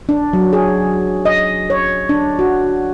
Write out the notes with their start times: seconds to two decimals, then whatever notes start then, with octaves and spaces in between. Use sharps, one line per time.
0.09 D4
0.33 F#3
0.53 G#4
1.25 D#5
1.70 C#5
2.09 D4
2.39 F#4